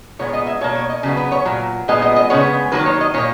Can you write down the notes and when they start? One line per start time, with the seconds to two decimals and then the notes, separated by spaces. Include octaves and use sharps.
0.19 A#2 G#3 B3 C#5
0.33 D#5
0.47 E5
0.61 B2 A#3 C#5
0.75 C#5
0.90 D#5
1.03 C#3 F#3 B3
1.17 B4
1.32 C#5
1.45 A#2 F#3
1.88 A#2 G#3 B3 D#5
2.02 D#5
2.16 D#5
2.30 C#3 G#3 B3 C#5
2.72 D#3 F#3 A#3 B4
2.86 C#5
3.01 D#5
3.14 A#2 C#5
3.18 A#3